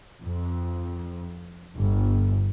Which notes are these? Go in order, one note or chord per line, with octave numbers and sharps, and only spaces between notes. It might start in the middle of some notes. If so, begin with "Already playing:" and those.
F2
G1